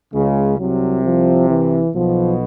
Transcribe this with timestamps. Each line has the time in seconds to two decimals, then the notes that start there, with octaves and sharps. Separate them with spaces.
0.14 C#2 C#3 G#3
0.59 C2 C3 F#3
1.05 F3
1.49 E3
1.94 B1 B2 F3